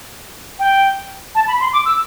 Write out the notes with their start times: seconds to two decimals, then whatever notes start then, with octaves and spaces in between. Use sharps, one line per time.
0.59 G5
1.35 A5
1.48 B5
1.60 C6
1.73 D6
1.85 E6